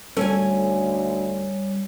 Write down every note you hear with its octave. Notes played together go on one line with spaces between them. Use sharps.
D2 G3 C#4 A4 G#5